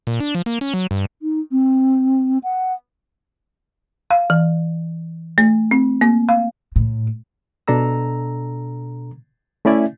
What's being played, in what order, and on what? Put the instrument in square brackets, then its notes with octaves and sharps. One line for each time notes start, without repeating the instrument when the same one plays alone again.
[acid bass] A#2
D4
F3
A#3
C#4
F#3
G2
[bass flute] D#4
C4
F#5
[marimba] F5
E3
A3
C4
A#3
F5
[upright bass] A2
[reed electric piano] B2 D4 A4 A#5 E6
A3 C#4 E4 D5 E5 G#5